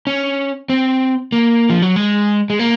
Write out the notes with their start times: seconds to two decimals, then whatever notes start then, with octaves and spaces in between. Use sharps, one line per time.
0.07 C#4
0.69 C4
1.32 A#3
1.70 F3
1.82 F#3
1.96 G#3
2.50 G#3
2.59 A#3